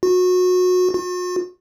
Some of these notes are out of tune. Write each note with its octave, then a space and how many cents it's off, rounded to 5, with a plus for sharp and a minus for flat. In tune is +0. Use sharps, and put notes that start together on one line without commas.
F#4 -25
F#4 -45